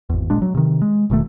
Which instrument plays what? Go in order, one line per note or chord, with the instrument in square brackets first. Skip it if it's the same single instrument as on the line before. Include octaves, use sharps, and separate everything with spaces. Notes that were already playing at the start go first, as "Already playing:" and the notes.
[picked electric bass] G#1 E2
E1 A#2 G#3 D4
F#3
C3 D#3
G#3
E1 B2 D#3 A3